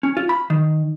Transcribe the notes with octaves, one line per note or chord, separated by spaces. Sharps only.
C#4
F4
B5
D#3